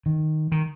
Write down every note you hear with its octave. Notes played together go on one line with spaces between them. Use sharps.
D#3
D#3